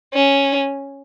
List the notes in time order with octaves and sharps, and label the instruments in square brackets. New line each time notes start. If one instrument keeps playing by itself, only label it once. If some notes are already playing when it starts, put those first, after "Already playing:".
[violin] C#4